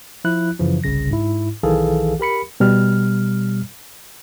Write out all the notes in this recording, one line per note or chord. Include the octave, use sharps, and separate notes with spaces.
F3 E4 F#6
F#2 C#3 E3 F3
G1 C2 C#3 A#6
G#2 E4
B1 D#3 E3 G#4 A4 F5
G4 A#4 B5 C#7
B2 G3 F6